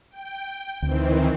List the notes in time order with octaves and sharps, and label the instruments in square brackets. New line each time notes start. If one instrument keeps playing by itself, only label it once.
[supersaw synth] G5
[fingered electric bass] D2 [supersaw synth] D#3 E3 C4